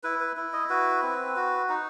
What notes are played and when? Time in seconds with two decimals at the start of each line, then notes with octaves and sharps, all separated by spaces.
0.03 E4 B4
0.20 B4
0.37 E4
0.53 D#5
0.70 F#4 B4
1.03 C4
1.36 F#4
1.69 D#4